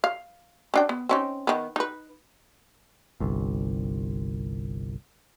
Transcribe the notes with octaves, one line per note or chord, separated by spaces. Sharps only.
F5
C#4 D4 G5
B3
C4 C#4 D#4
D#3 B3
D#4 B4
G1 C2